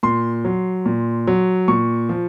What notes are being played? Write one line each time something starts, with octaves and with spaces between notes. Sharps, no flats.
A#2 C6
F#3
A#2
F#3
A#2 C#6
F3